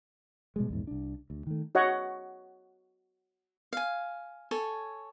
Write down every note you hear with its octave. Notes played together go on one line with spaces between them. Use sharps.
B2 G3 G#3
A#1 E2 G#2
C2 D4
D2
D#3 A3
F#4 C#5 D#5 F#5
F5 G#5
A4 C#5 G#5